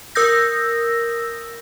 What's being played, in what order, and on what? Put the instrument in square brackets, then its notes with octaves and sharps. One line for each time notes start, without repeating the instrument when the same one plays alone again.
[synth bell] A#4 D#6 E6 G6 A#6